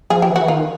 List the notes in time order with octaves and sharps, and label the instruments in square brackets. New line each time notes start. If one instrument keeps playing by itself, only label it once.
[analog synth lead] F3 [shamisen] G#4
[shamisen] G4
[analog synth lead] E3
[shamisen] F#4
[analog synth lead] E3
[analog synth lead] D#3 [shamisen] F4